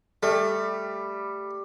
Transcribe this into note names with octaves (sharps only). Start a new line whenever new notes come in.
G3 A3